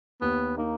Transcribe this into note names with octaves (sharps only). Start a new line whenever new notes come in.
D#2 B3
A#3 D#4